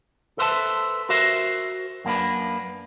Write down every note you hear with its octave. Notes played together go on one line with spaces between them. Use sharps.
A4 B4 C5 E5 A5
F#4 A#4 C5 E5
F#2 A#3 D4 B4